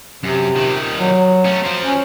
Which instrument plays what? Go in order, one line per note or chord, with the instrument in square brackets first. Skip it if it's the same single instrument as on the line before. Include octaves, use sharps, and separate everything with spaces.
[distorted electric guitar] F#2 [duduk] C3
[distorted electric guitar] A#2 D#3
[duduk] F#3
[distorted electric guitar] A3 C#4
F3 C4
[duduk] C#4